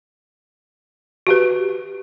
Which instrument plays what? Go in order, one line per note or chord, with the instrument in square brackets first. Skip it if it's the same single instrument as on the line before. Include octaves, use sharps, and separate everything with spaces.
[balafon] F#4 G4 B4